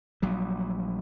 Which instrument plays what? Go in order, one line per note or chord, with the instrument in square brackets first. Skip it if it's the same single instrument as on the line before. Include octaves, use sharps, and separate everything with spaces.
[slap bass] A#1 F#3 G3